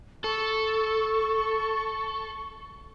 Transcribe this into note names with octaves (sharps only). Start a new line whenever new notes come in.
A4 C#6